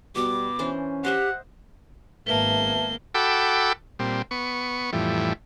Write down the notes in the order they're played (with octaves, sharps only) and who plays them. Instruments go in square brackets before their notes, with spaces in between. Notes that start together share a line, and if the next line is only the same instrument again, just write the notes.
[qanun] B2 B3 [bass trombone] G3 [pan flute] D6
[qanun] E3 D4 C5 [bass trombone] C#4
[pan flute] G4 [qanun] C5 D#5 E5 [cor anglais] F#5
[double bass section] G#1 [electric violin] A#3 B3 [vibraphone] B4 E5 A5 [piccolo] G7
[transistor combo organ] F#4 A4 G5 B5 D6 E6
A#2 G3 C4
B3 C#6
F2 A2 E3 G3